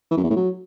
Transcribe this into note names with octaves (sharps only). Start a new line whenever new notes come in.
E3
F#2
E2
A2
F#3